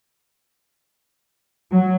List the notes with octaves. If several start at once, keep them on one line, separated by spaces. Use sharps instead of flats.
F#3